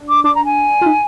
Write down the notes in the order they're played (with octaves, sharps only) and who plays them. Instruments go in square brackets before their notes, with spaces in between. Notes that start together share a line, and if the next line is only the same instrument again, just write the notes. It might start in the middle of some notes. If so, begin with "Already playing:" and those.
Already playing: [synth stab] D4
[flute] D6
[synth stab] D4 [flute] D6
[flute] A#5
G#5
[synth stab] F4
D#4